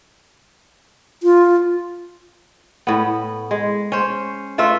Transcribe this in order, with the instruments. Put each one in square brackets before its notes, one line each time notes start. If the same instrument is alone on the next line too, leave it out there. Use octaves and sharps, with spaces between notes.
[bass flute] F4
[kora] A2 B3
G#3
C#4 C5
A3 F4 B4 E5